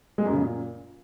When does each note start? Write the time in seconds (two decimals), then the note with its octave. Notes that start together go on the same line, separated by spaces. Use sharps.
0.18 G#3
0.26 F#2
0.33 C#3
0.41 A#2